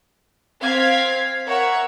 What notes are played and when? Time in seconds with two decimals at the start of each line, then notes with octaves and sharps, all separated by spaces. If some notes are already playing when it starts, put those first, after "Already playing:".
0.60 C4 F5 G#6 B6
1.47 A#4 C#5 E5 F#5